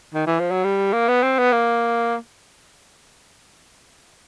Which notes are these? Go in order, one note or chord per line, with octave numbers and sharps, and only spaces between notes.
D#3
E3
F3
F#3
G3
A#3
B3
C4
B3
A#3